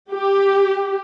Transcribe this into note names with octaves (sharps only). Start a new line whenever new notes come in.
G4